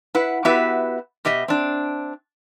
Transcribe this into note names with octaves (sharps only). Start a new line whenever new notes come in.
E4 B4 F#5
B3 E4 F#4 G4 B4 E5
B2 G4 D#5 E5
C4 D4